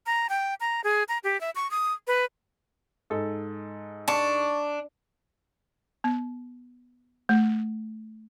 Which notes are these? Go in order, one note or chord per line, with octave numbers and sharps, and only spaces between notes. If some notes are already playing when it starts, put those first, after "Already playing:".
A#5
G5
A#5
G#4
A#5
G4
E5
C#6
D#6
B4
G#2 A4
D4 A5 C#6
B3
A3